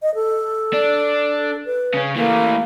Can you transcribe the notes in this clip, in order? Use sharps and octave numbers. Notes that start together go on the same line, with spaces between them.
D#5
A4
D4
B4
C#3 C#4
E3 A3 A#3